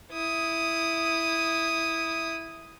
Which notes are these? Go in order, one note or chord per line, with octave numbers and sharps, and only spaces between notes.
E4 D#6